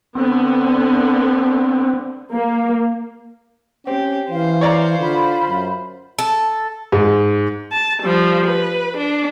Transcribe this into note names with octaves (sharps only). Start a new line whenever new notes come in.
D3 B3 C4
A#3
C4 C#4 G4
E3 C5 F5
C#5 D5 F5 A#5
D3 F4 B5
F#2
A4
G#2
A5
F3 G3
B4
D4